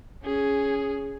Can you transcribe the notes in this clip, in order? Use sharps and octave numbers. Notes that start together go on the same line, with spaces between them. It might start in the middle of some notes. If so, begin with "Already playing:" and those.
C#4 G#4